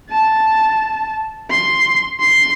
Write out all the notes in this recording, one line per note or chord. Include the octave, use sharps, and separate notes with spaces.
A5
C6
C6